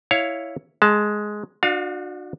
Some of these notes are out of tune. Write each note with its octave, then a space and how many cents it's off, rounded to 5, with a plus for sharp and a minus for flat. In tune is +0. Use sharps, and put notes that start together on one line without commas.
E4 +0 C#5 +5 F5 +0
G#3 +10 A5 +0
D4 +30 F#4 -30 F5 +20